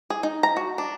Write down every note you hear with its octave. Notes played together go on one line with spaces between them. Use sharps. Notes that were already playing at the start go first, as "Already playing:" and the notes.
G#4
D#4
A#5
F#4
D4